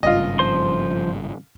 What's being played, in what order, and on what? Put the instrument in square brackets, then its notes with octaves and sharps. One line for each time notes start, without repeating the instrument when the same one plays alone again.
[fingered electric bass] G#1 G2 C#3 [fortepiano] F4 D#5
[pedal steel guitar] F3 C5 C6